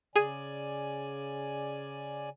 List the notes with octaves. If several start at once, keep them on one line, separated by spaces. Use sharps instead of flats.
C#3 G#4 D5 G#5 D#7